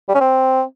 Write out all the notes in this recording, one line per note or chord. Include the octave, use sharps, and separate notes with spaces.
G3
C#4
C4